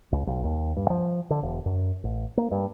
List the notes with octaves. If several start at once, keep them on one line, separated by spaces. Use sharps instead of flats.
C#2
B1
D#2
G2
F3
D3
E1
F#2
A1
A#3
G2